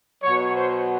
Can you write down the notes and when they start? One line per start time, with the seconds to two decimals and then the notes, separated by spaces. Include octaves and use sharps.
0.23 B2 F#3 C#5
0.55 C5